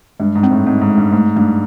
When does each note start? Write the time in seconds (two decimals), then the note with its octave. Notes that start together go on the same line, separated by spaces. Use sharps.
0.20 G2 G#3
0.35 G#2
0.43 C4
0.51 A2
0.67 G#2 C4
0.81 G#2
0.90 G#3
0.97 G2
1.12 G#2 A3
1.36 G2 A3